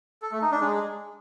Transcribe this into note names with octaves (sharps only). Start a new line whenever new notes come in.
A4
A3
D#4
D4
G#3